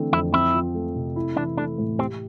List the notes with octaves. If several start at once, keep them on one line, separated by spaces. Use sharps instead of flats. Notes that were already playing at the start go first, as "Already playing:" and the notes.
Already playing: D3 E3 A3 C4
F2 E4
C4 E4
F3
A3
C3
E4
E3 D4
A3 D4
A2
C4 G4